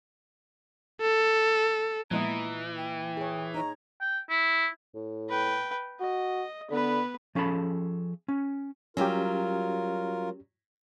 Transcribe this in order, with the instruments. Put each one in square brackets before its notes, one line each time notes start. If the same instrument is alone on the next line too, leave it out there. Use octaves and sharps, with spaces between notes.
[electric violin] A4
[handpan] A#2 E4 D#5 [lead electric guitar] E3 [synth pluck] F3 G#3 B3 [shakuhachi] A#5
[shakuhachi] G5
[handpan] G#4 C#5
[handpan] D#4 C#5 [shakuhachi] A#5
[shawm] G5
E4
[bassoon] A2
[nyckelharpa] B4 G5
[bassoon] F#4 [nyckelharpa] D#5
[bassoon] D3 [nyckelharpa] B3 B4
[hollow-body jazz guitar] F3 C#4 G#4 A4 B5
C#4
[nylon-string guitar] F#3 G3 [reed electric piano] C#4 G4 [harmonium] F4 A#4